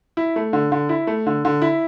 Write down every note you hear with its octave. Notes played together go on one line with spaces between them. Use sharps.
E4
A3
D3
D3
E4
A3
D3
D3
E4